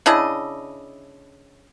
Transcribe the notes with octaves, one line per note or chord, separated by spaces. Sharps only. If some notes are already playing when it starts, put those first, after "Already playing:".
C#3 D4 E4 D#5